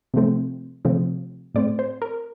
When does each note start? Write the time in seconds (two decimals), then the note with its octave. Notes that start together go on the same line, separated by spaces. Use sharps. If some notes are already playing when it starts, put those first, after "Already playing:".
0.14 C3 F3 A3 C4
0.85 C3 F3 A3 C4
1.54 A2 A3 C4 D5
1.79 C5
2.02 A#4